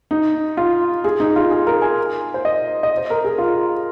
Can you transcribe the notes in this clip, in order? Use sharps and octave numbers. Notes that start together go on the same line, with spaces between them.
D#4
F4
G#4
D#4
F4
G#4
A#4
G#5
C5
D#5
D#5
C5
A#4
G#4
F4